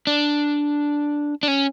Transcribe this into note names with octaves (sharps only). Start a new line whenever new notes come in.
D4
D4
C#4